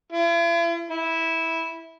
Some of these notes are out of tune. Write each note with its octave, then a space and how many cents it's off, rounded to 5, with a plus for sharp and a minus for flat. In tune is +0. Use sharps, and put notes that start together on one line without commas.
E4 +45
E4 -10